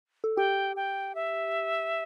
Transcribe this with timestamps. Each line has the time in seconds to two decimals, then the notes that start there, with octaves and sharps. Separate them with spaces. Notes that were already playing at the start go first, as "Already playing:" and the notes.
0.24 A4
0.37 G4 G5
0.76 G5
1.15 E5